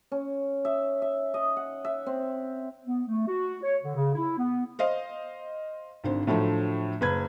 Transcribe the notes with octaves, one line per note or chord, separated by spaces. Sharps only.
C#4
E5
E5
D#5
F#5
E5
C4
B3
A3
F#4
C#5
D3
C#3
E4
B3
C5 D#5 F5
G#1 D3 C5
A2 D3 F3 F#3 A3
F#1 B4 G#6